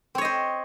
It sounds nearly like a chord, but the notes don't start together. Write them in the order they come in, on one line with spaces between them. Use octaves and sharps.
C4 C#5 D#5 C5